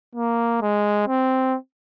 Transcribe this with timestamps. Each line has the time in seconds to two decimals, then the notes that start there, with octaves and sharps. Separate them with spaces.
0.16 A#3
0.62 G#3
1.08 C4